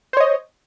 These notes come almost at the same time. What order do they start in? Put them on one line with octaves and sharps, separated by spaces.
C5 C#5 D#5